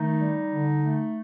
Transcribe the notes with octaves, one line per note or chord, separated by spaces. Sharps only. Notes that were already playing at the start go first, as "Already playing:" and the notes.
Already playing: D#3 A3 D#4
G3
D3
A3